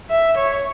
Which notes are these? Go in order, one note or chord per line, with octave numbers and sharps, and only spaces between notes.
E5
C#5